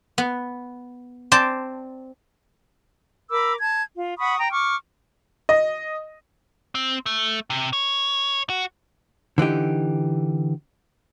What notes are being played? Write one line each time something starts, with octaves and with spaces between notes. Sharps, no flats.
B3
C4 C5 D5 A5
A#4 B5 D6 E6
A5 G#6
F4
F#5 B5 C#6 D#6
G5 A#5
C#6 D6 F6
D#5
C4
A3
C3
C#5
F#4
D3 E3 D#4 G4